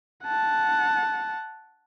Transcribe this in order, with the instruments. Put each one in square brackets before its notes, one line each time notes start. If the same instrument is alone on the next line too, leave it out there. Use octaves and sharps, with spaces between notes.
[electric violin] F#5 A5